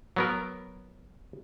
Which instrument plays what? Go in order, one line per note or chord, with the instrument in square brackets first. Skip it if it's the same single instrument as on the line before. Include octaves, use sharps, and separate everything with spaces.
[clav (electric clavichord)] F#3 B3 A#4